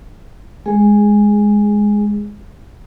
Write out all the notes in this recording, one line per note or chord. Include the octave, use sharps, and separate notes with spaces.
G#3 G#4